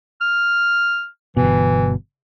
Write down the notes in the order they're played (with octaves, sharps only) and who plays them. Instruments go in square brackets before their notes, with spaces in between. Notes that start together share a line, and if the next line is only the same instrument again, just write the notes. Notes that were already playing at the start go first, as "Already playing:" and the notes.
[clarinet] F6
[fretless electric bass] G1 B2 [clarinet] E3